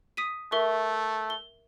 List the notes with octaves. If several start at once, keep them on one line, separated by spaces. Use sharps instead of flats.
D#6 B6 D#7
A3 A#4 E5 C#6
G7